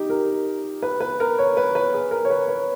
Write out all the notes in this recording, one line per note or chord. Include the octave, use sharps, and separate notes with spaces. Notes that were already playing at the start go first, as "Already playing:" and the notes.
Already playing: D#4 G4
A#4
B4
B4
A#4
C#5
B4
B4
G#4
A#4
C#5
B4
B4